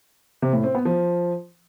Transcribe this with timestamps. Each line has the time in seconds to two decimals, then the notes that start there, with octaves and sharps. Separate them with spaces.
0.42 C3
0.53 A2
0.64 C4
0.75 B3
0.85 F3